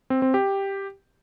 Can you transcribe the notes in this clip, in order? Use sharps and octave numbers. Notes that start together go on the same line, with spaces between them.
C4
C4
G4